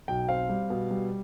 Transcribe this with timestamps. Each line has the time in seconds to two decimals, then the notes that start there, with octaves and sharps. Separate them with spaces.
0.08 B1 G5
0.29 C4 F5
0.49 G3
0.70 B2
0.91 G3